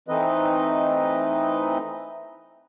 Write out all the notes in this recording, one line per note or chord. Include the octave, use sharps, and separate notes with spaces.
E3 A3 C4 D#4 B4 D#5